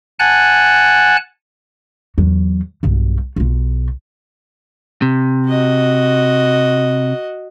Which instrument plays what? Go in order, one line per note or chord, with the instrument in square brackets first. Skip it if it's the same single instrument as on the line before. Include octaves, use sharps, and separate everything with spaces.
[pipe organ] F#5 G#5 A5 F#6
[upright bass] E2 F#3
B1 G2
B1 F4
[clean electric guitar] C3
[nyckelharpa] F#4 D#5